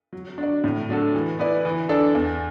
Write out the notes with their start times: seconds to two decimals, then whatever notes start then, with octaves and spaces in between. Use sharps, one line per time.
0.13 F#3
0.38 D4 F#4 D5
0.64 A2
0.89 F#3 D4 F#4 A4
1.15 E3
1.39 B3 E4 B4 D5
1.65 E3
1.89 D4 A4 D5
2.15 E2